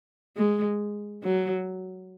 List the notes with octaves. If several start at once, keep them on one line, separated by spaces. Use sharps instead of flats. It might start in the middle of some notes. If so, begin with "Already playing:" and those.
G#3
F#3